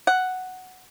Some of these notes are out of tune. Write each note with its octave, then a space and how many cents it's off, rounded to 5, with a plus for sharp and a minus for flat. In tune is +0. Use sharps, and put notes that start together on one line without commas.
F#5 +0